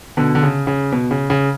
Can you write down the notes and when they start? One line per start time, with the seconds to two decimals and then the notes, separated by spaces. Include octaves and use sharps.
0.17 B2 D3
0.35 D3
0.43 C#3
0.67 C#3
0.92 B2
1.11 C#3
1.30 C#3